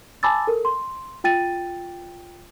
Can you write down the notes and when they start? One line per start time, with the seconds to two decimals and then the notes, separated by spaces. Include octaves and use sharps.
0.23 G#5 A5 B5 D6 E6 A6
0.47 A4 A#4
0.65 C6
1.24 F4 G5 A6 D#7